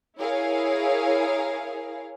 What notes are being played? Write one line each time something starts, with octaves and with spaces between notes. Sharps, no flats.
E4 G#4 A#4 C#5 F5